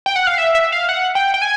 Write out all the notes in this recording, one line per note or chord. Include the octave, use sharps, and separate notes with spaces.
G5
F#5
F5
E5
E5
F5
F#5
G5
G5
G#5